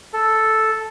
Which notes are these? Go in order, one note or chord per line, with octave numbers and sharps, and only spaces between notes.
A4